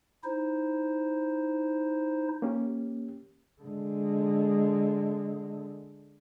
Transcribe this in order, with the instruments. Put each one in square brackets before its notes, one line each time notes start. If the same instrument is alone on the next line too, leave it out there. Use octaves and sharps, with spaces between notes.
[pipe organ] D#4 E4 C5
[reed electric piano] A#3 C#4 G4
[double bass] D3 G#3